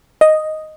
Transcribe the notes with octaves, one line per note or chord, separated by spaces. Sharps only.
D#5